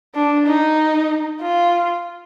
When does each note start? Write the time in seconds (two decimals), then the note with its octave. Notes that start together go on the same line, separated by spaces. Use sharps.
0.15 D4
0.46 D#4
1.42 F4